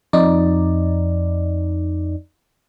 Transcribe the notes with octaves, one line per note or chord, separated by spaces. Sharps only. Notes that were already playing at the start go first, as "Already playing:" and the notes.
F2 D#4 D5